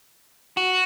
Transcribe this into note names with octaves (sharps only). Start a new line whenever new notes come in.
F#4